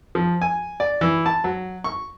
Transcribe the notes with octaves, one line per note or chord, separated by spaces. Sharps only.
F3
G#5
D5
E3
A5
F#3
C#6